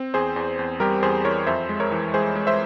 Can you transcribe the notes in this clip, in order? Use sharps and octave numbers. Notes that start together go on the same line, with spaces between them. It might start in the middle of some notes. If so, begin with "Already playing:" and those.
Already playing: C4
E2 G#4 C5
E2
E2
G3 G4 A#4
E2 G#4 C5
E3 A#4 C#5
F2 C5 E5
G#3
A#4 C#5
E3
G#3 G#4 C5
G#3
C5 E5